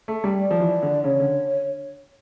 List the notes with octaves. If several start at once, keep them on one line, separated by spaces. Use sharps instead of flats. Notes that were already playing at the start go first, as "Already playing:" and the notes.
A3
G3
D5
F3
E3
D3
C#3 C#5
D3